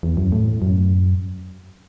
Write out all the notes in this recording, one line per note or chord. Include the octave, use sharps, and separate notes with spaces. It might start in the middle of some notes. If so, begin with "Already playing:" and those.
E2
F#2
A2
F#2